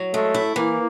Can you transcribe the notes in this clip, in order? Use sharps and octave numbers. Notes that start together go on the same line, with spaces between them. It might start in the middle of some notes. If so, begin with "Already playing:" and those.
Already playing: F#3
G#3 A3
E4
E3 A#3